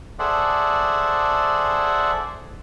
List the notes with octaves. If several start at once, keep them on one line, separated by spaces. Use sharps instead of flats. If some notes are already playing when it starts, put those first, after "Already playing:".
G#4 A4 C5 D5 E5 F#5